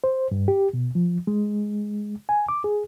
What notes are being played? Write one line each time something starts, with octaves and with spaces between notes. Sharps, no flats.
C5
G2
G4
B2
F3
G#3
G#5
D6
G#4